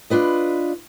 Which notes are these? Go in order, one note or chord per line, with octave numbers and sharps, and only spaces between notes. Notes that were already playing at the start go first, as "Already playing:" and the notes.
D4 F4 B4 D#5